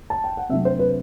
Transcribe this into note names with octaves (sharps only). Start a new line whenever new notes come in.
A5
G5
F#5
C3 F#3 A3 D4 E5
C5
B4